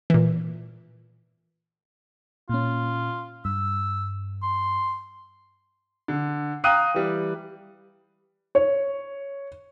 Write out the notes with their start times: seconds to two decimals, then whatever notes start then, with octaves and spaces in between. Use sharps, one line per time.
0.10 A#2 E3
2.49 A#2 C#4 F4
3.45 G2 E6
4.42 C6
6.08 D3
6.64 F5 G5 A#5 D#6 F#6 D#7
6.94 E3 G3
8.55 C#5